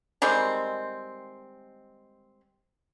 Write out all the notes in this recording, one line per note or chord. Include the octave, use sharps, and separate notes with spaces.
D#3 G3 G#3 C4